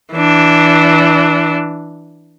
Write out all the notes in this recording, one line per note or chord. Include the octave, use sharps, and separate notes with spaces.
E3 D4